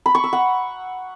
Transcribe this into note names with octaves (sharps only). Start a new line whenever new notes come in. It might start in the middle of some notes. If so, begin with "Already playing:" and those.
B5
C#6
E6
F#5